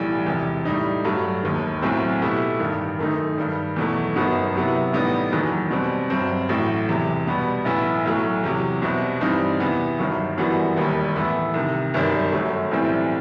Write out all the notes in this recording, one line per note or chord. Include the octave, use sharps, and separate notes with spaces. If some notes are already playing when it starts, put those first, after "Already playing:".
Already playing: B1 A2 E3 G3
E1 E2 C3
A2 G3 D#4
G2 F#3 A3
E1 D#2 D#3
B1 A2 F#3 A3 C4
B2 A3 E4 G4
A1 G2 D#3
F#2 D#3 A3 D#4
G2 D#3 G3
E2 B2 F#3 A3
G1 F#2 F#3 B3 D#4
C2 C3 F#3 B3 E4
A1 A2 G3 B3 D#4
F#1 E2 D#3 F#3
B2 G3 C4
G1 G2 F#3 C4
A1 A2 F#3
E1 E2 C3 E3
B2 G3 B3
B1 A2 E3 B3 E4
B1 A2 F#3 A3
E2 C3 F#3
C2 B2 G3 C4
G2 E3 G3 C4 D#4
E2 C3 E3 B3
G1 G2 D#3 F#3
F#2 E3 G3 B3 F#4
E1 D#2 D#3 G3
A2 E3 B3 E4
C2 C3 D#3
G1 F#2 D#3 G3
G1 F#2 F#3 A3
B1 A2 E3 G3 C4